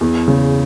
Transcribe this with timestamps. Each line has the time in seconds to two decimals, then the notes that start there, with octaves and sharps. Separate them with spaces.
0.01 E2
0.28 C#3